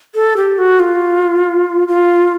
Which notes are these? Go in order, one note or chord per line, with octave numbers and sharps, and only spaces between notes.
A4
G4
F#4
F4
F4